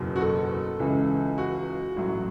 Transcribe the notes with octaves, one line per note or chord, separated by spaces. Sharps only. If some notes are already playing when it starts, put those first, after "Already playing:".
Already playing: F#1 E2 B2 F#3
F#4
A4
C#2 C#3 E3
F#4
A1 A2 F#3